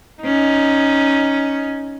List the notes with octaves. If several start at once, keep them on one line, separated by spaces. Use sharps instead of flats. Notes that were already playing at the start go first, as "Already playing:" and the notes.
C#4 D#4